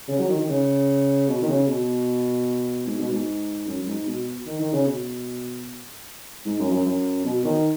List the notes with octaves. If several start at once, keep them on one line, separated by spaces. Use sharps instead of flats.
C#3
F#3
D#3
D#3
C#3
B2
D#3
C#3
B2
G#2
B2
G#2
F#2
F#2
G#2
B2
D#3
D#3
C#3
B2
G#2
F#2
F#2
F#2
B2
D#3